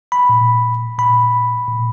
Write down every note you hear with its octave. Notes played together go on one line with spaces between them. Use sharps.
B5
A#2
A#2 B5
A#2